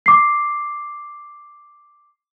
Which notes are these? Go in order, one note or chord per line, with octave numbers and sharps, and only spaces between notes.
D6 C7